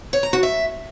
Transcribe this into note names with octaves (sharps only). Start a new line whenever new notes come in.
C#5
A#5
F#4
E5